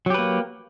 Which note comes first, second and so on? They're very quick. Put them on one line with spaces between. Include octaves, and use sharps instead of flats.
F#3 G4 B4 A#3